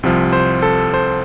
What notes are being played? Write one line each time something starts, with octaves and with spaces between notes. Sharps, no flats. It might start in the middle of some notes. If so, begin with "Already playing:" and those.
C2 C3 F3
C5
A4
C5